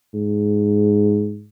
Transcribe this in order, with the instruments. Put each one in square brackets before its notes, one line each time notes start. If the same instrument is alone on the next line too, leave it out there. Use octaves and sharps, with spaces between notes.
[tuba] G#2